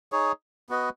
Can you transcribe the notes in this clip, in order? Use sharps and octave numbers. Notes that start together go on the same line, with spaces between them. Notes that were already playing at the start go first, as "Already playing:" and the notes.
D#4 G#4 C#5
B3 F#4 B4 D#5